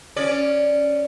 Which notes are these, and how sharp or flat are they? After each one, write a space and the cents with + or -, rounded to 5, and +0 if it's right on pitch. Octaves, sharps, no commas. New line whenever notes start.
C#4 +0 D5 +0